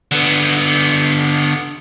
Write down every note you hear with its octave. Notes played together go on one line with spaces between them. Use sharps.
D3 B3